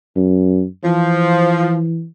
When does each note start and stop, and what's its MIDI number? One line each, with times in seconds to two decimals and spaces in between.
0.16 0.65 42
0.84 2.06 52
0.84 1.87 53